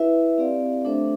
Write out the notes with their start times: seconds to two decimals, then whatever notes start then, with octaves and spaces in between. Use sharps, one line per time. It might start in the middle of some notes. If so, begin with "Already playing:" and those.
Already playing: E4 B4 E5
0.38 C4 G4 D5 F5
0.85 A3 D4 A4 C5 E5